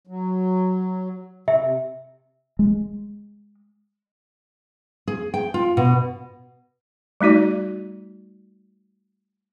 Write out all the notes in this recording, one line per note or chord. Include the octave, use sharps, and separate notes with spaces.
F#3
C3 E5
G#3
G#4
G5
F4
B2
G3 A3 D#4 F#4 D5